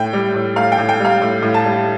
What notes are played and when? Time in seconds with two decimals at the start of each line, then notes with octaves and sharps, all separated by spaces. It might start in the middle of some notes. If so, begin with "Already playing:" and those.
Already playing: A2 G5
0.13 G3
0.34 A2
0.56 A2 F5
0.72 G5
0.78 A2
0.89 G5
1.00 G3 F5
1.22 A2
1.42 A2
1.54 A5
1.65 G3